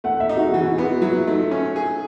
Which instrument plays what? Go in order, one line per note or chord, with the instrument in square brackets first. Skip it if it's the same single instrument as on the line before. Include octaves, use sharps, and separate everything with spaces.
[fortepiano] A3 [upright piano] F#5
[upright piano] E5
[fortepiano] D#4
[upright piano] F#4
G#4
[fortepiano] E3 [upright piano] F#4
[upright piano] G#4
F#4
G#4
[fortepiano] B3 [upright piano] F#4
[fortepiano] F#3 [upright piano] E4
[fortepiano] A3 [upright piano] D#4
[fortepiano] C#4
G#4